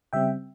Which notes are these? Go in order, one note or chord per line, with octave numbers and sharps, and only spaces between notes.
C#3 G3 C4 E5 G5